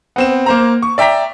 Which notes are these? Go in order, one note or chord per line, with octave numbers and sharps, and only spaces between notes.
B3 C4 E7
A#3 C5 A#5
C#6
D5 E5 G5 A#5 B6